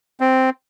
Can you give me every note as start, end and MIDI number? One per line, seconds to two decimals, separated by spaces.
0.20 0.50 60